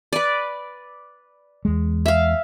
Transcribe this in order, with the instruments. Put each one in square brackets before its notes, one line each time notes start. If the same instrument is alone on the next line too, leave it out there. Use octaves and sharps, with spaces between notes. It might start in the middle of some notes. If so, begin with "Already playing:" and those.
[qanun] B4 D5
[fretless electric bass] E2 G#3
[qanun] E5 F5